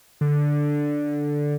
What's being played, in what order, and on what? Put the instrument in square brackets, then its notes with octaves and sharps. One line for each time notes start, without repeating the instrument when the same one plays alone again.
[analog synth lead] D3